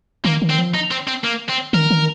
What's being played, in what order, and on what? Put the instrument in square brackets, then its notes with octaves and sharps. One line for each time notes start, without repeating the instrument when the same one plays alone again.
[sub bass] D#3 [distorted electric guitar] A#3
[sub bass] D#3
[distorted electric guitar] C4
[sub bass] F3
[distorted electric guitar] D#4
C4
C4
A#3
C4
[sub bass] D#3 [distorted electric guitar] A#4
[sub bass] D#3